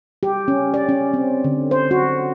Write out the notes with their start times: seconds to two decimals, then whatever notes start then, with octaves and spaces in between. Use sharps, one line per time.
0.23 G4
0.48 C#4
0.74 D5
0.89 C#4
1.14 C4
1.44 D3
1.71 C5
1.91 F#4